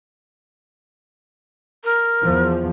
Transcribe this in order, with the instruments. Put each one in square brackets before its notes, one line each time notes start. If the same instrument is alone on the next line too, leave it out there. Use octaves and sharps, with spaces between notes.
[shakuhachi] A#4
[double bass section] E2 F3